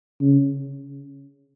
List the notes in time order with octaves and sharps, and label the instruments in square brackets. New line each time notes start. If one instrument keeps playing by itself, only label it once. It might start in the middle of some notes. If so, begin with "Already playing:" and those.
[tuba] C#3